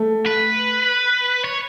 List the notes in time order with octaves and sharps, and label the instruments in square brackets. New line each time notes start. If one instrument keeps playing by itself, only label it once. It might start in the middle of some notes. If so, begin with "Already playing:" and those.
Already playing: [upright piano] A3
[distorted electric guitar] B4
C#5